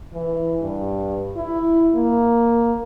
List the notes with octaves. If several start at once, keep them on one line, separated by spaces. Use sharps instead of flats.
E3
G2
E4
A#3